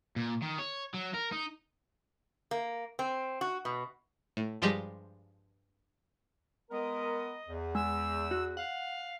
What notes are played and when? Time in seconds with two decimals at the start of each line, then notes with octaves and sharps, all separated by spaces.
0.16 A#2
0.42 D#3
0.59 C#5
0.94 F#3
1.14 A#4
1.32 D#4
2.51 A#3
2.99 C4
3.41 F#4
3.65 B2
4.37 A2
4.62 G2 F3 G3 G#3 G4
6.71 G#3 B3 A#4 D#5
7.48 E2
7.75 G#3 E6
8.31 F#4
8.57 F5 F#5